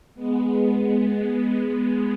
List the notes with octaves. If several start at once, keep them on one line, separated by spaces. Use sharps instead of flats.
G#3 B3